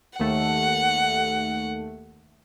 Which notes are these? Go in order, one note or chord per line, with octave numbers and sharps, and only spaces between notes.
D#2 A3 F#5